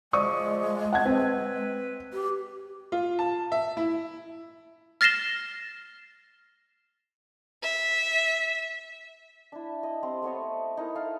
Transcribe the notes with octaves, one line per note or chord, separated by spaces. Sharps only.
F3 G#3 D5 C#6 D#6
F#5 A5 G#6
C4 B4
G4
F4
A5
E5
E4
F6 A6 A#6 C7 E7 G7
E5
D4 E4
D#5
G3 C4 C5
A3 B3 C#5 D#5
D#4 E4 A#4
A4 F5